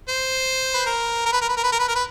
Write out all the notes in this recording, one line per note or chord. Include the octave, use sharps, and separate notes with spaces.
C5
B4
A#4
A#4
B4
A#4
B4
A#4
B4
A#4
B4
A#4
B4